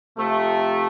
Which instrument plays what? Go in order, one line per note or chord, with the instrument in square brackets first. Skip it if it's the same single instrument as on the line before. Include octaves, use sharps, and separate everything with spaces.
[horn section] C3 F3 A3